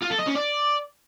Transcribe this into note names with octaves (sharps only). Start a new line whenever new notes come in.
F4
A4
D#5
C#4
D5